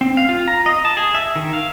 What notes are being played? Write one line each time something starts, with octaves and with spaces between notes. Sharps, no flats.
C4
F5
F4
A#5
D#5
A5
G#4
E5
D#3
F5